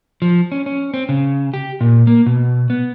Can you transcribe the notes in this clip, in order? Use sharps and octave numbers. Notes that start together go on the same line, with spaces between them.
F3
C#4
C#4
C4
C#3
G4
A#2
A#3
B2
B3